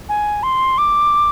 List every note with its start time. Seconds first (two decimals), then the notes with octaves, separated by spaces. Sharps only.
0.09 G#5
0.43 C6
0.78 D6